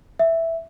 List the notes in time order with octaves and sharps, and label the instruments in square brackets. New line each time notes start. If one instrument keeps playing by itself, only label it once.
[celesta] E5